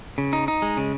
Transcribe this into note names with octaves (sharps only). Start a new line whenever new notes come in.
C#3
D#4
D#4
G#3
C#3